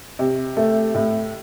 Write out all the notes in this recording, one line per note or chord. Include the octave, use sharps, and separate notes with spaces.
C3
A3
A2